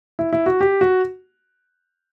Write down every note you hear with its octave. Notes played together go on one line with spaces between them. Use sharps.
E4
E4
F#4
G4
F#4